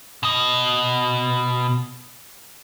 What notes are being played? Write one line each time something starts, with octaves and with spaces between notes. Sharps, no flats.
B2 D#5